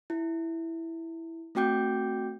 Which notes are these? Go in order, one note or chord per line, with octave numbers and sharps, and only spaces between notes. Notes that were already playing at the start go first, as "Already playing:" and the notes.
E4
A3 C4 F#4 G5 D6 G6